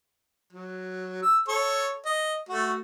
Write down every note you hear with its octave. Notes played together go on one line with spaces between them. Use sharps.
F#3
E6
A4 C#5 C#6
D#5
A3 F#4